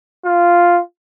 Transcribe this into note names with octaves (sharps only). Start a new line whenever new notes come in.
F4